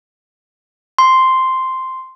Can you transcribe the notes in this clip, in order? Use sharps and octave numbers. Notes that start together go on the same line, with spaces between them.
C6